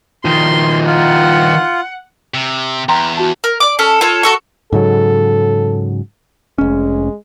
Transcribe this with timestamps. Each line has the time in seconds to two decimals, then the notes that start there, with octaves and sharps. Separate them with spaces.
0.25 D#3 F3 C6
0.87 F4 F#5
2.34 C3
2.89 E2 G5 A#5 C6
3.17 F#4 A5
3.44 A#4
3.60 D5 D6
3.79 C#4 A4
4.01 F4 A4 C#5
4.23 F#4 A4 C#6
4.72 G#2 C#3 F#3 A4
6.58 F1 G#3 C#4